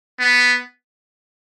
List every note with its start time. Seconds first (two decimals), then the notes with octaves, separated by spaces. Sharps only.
0.20 B3